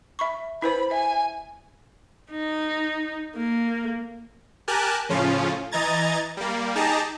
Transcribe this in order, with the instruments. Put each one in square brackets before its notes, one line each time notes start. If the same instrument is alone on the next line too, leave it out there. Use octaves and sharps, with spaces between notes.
[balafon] E5 B5 C#6
[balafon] E4 B4 C5 [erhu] B5
[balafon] E5 [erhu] G#5
[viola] D#4
A#3
[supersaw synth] G4 A#4 G#5 A5 F#6
A2 C#3 F3 C#4 F4
E3 D#5 A#5 G#6 A6
G3 A#3
D#4 G4 G#4 A5 A#5